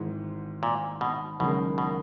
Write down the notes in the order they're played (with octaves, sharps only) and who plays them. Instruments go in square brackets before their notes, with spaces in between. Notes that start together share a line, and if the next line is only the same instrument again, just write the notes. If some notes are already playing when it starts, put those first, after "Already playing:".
Already playing: [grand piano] G#1 G#2 E3
[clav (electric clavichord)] A#2
B2
[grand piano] F#1 F#2 D#3 G#3 [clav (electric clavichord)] B2
[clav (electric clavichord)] B2